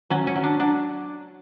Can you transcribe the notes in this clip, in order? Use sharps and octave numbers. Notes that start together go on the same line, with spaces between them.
F#3 C#4
C#4
F#3
D4
F#3 D4